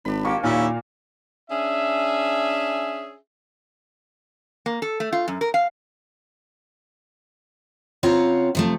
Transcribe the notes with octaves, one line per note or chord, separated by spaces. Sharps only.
G#1 D4 B5
A#2 D#3 A#3 G4 C#6
D#2 A#2 C#4 E4 F5
C#4 D4 G#4 E5
A#3
A4
A3
F4
F#2
A#4
F5
C#3 C4 F4 C#5 F#5 A#5
C3 F3 A3